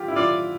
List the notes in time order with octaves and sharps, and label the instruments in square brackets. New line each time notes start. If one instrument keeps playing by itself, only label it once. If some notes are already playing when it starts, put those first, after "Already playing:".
Already playing: [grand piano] F4 G4
E4
[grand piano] F4 [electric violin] D5